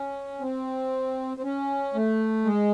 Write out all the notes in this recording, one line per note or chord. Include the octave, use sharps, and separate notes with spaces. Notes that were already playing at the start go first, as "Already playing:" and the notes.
Already playing: C#4
C4
C4
C#4
A3
G#3